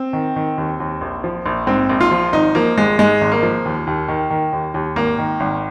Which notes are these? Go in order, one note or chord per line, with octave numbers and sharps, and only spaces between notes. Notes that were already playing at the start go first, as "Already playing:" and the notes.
Already playing: C4
D#3
D#3
D#2
D#2
A#1
F3
A#1
G#2 C4
A#1
F4
F3
G#1 D#4
F3 A#3
G#1 G#3
G#2 G#3
G#1
A#3
F3
D#2
D#2
D#3
D#3
D#2
D#2
G#1 A#3
D#3
G#1